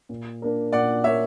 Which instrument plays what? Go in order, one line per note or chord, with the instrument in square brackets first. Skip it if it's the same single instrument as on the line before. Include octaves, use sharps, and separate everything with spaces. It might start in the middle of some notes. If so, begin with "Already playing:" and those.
[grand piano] A#2
A#3 D4 A#4
[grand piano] A#2 [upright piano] D5 F#5
[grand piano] A#3 D4 A#4 [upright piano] C#5 E5